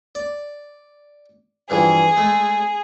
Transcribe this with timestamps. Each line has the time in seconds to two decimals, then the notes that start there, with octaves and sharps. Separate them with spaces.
0.15 D5
1.70 G2 E3 F3 G#4
2.17 G#3 A3